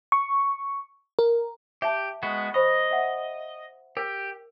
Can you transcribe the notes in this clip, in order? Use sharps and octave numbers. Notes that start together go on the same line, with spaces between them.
C#6
A#4
G4 E5 A5
G#3 B3 F#4
C5 D#5 B5 C#6
E5 F#5
G4 A#4